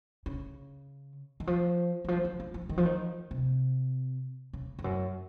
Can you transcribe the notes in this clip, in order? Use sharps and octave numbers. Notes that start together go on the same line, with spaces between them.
C#3
D#3
F3
D#3
F3
D#3
F3
F3
D#3
F3
D#3
C3
C#3
F2
F#2